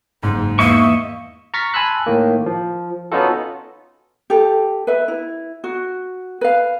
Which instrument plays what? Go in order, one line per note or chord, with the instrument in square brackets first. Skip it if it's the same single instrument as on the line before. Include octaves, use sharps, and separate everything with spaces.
[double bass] F#1 G#3 [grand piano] G#2 [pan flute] D#4
[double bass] E2 [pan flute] A#3 [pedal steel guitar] D#5 E5 C#6
[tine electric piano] A#5 C#6 F6 A6 B6
G#5 A5 B5 C6 E6 F#6
A2 D#3 A#3
F3
B3 C#4 D#4 F4 F#4 A4
[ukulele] G4 A4
B4 E5
E4
F#4
B4 F5